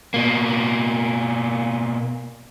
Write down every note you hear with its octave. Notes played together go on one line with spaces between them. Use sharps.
B2 A#3